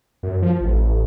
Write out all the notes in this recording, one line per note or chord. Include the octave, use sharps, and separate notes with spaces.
F#2
F3
A1